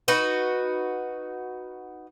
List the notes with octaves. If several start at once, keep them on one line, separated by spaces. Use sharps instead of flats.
D#4 F#4 B4